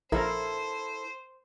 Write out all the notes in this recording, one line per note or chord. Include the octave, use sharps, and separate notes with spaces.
A#1 E4 A4 A#4 C5